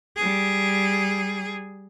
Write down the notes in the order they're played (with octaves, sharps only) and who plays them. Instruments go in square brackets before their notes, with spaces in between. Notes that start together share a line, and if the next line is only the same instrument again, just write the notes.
[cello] G3 G#4